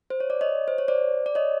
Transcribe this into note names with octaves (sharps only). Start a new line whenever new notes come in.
C5
C#5
D5
C#5 D#5
C5
C#5
C5 D5
D5
C#5 D#5